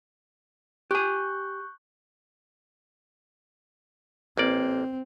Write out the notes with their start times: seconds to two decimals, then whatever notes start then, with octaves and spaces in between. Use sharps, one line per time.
0.91 G4 G#5 C#6 F#6 G6
4.37 A1 A#3 C4 D5